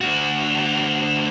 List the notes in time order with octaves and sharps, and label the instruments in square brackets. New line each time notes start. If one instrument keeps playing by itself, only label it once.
[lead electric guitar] D2 F#4